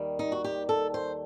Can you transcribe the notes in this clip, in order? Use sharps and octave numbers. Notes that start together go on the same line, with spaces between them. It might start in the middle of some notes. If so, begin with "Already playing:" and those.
Already playing: D#2 D#3 G3
D#4
F#4
G4
A4
C5